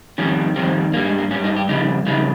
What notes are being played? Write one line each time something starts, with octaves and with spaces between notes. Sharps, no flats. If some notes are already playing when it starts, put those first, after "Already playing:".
F2 D#3 G3 C#4
F2 D#3 G3 C4
G2 G3 A#3
G#3
A#3
G2 G3 C#4
D#4
G4
F2 C#3 G3 D#4
F2 C#3 G3 D#4